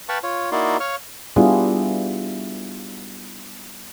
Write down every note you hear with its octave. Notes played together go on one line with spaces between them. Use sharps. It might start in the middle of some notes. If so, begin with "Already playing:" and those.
B4 F5 G5 A5 B5 C#6
F4 C#5
A#3 D#4 E4 F#4 D5 C6
C#5 F5 C#6 F6
G3 B3 D4 E4 F4 G#4